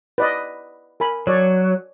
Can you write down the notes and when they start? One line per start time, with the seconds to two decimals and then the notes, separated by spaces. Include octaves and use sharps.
0.18 B4 D5 D#5
1.00 A#4 G#5 B5
1.27 F#3 C#5 D5